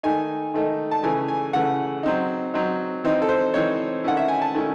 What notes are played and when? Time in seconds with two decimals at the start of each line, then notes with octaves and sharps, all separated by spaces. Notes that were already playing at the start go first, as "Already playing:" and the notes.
0.03 D#3 A3 D#4 G#5
0.54 D#3 A3 D#4
0.91 A5
1.03 C#3 E3 A3 G#5
1.28 G#5
1.53 C#3 E3 A3 F#5
2.03 F#3 C4 D#4
2.54 F#3 C4 D#4
3.04 E3 C4 D#4
3.22 A4
3.29 C5
3.54 E3 C4 D#4 C#5
4.04 D#3 A3 C#4 E4 F#5
4.17 E5
4.28 G#5
4.42 A5
4.54 D#3 A3 C#4 E4